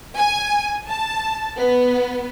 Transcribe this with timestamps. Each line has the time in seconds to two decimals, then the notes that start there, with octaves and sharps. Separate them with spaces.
0.16 G#5
0.88 A5
1.59 B3